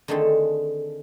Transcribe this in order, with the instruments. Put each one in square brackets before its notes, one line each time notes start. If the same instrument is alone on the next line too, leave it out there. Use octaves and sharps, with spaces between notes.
[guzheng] D3 D#3 A3 C4 G#4 A4